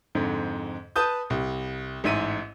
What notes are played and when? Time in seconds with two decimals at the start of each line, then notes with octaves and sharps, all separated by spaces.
0.15 F2 G#2 D3
0.96 B4 A5 D#6 G6
1.30 C2
2.04 A1 G#2 E5 D#7